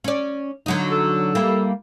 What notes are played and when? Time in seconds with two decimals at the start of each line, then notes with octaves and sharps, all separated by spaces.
0.04 C#4 D5
0.66 D3 F#3 D#4
0.91 A4
1.35 G3 A#3 E4